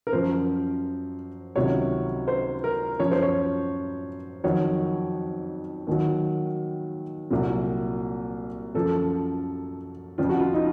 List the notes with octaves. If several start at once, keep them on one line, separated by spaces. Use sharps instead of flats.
A#4
F#2 F3 C5
C#2 C3 D#3 F#3 C#5
C5
A#4
F#2 F3 C#5
C5
C#5
F2 D#3 F#3 C#5
D#2 D#3 F#3
C2 A#2 F#3
F#2 F3 A4
F2 C#3 F3 F4
F#4
F4
D#4